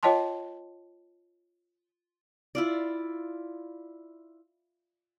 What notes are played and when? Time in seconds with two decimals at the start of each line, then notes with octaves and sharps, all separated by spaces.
0.03 F4 C#5 D#5 G5 A5 C6
2.55 E4 F4 D5